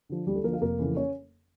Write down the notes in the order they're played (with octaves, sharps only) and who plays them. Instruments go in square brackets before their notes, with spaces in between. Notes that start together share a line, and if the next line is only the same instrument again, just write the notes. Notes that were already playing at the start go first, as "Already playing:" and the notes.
[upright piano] D3 F3
D2 G3 G4
A3 A4
D3 F3 A#3 A#4
F4 F5
F1 A#3 A#4
F2 C#3 E3
C#4 C#5